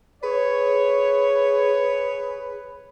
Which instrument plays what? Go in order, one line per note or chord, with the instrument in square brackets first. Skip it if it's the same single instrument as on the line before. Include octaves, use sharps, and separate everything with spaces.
[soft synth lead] G#4 [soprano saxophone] B4 [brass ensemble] C#5